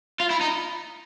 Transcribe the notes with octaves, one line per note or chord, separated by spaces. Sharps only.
F4
E4
D#4